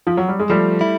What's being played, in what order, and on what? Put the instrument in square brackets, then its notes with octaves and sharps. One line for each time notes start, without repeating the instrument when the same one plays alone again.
[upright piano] F3
F#3
G3
G#3
[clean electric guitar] F3 [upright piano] G3 A3
[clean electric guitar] E4